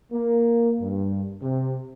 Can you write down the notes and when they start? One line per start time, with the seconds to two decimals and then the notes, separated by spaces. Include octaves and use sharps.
0.12 A#3
0.81 G2
1.42 C3